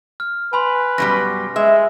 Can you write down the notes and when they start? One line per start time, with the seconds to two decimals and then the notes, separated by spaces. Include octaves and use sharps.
0.20 F6
0.53 B4 G#5 B5 C6
0.98 F#2 B2 G3 A#6
1.56 G#3 E5